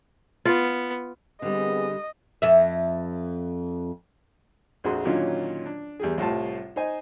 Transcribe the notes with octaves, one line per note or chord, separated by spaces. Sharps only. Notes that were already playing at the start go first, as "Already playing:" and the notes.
B3 F4
D3 G3 B3 C4 G#4 D#5
F2 E5
A#1 F2 F#4 G#4 C6
A#2 D3 D#3 F#3 C#4 F4
D4
E2 G3 G#4
C2 A2 G3 F4 A5
D#4 C5 D#5 G#5